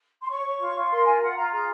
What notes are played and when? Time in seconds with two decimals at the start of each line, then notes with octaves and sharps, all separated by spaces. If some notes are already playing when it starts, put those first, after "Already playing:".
0.23 C6
0.29 C#5 C#6
0.44 C#5
0.60 F4
0.75 F4
0.91 A#4 C6
1.05 F4 G#5
1.21 F4 F#5
1.36 F4 A#5
1.52 G#4 A#5